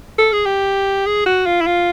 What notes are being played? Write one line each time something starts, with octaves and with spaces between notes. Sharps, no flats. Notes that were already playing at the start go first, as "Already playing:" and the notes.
A4
G#4
G4
G#4
F#4
F4
E4
F4